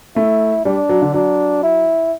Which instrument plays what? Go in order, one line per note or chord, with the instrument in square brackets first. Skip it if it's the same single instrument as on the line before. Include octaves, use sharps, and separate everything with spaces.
[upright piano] A3 [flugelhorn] E4
[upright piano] G3 [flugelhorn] D4
[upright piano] F#3
D3
[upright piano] F#3 [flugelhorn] D4
[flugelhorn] E4